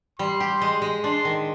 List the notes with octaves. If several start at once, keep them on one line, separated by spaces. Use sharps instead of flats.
G3 C6
G4
G#3
G#3
D4 C6
D#3